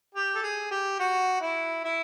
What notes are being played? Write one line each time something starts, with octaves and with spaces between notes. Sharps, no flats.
G4
A4
G#4
G4
F#4
E4
E4